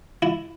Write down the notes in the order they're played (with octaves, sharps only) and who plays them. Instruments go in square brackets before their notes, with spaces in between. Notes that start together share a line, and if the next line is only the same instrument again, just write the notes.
[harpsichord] E4